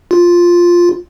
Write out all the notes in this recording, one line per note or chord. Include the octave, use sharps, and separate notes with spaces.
F4